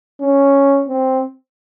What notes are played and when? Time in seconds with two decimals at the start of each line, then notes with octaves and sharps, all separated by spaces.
0.21 C#4
0.88 C4